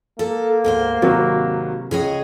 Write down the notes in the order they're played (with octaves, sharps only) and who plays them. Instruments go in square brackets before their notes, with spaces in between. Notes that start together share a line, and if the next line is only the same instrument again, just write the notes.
[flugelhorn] A#3 [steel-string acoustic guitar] A4
[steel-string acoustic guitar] D2 G#2 C5
[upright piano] G#1 F#3 F#4 [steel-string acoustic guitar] C3
[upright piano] C#2 [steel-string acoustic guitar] G#4 C#5 D#5